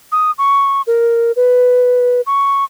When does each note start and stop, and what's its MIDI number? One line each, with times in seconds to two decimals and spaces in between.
0.12 0.31 87
0.38 0.82 85
0.87 1.32 70
1.36 2.21 71
2.26 2.65 85